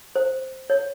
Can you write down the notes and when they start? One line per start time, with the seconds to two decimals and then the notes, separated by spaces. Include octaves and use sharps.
0.16 C5
0.70 C#5